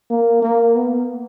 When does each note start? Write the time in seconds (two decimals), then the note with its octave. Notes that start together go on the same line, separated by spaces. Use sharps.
0.10 A#3
0.42 A#3
0.75 B3